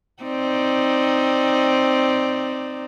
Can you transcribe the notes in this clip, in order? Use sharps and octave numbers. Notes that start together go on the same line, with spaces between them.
C4 D#4 D5